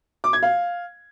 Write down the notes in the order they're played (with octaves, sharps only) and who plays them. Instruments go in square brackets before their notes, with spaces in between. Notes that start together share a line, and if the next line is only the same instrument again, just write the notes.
[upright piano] D6
G#6
F5